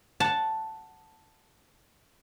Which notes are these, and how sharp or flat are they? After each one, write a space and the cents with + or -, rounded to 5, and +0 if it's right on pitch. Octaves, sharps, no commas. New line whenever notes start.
F#5 +0 A5 +0